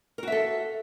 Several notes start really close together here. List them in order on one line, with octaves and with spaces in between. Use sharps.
A#4 F#4 E5 A4